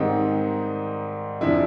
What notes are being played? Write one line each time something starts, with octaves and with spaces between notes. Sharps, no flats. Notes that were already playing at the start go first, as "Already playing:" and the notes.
Already playing: G#2 D#3 G3 C4 D#4
F1 C3 F3 D4 E4